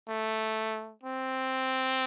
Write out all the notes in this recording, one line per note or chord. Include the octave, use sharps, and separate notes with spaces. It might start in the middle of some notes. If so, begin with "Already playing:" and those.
A3
C4